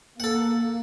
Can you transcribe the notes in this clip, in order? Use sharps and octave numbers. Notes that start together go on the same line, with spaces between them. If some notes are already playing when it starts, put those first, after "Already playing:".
A#3 A4 F#5